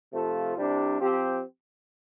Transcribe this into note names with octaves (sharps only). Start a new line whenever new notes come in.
C3 F3 A3 F4 A4
C2 C3 G3 D4
F3 C4 G4